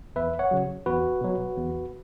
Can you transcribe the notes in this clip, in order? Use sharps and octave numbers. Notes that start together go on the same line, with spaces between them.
E2 B4 E5
C#5 F#5
C#3 F#3
E2 F#4 B4
B2 F#3
E2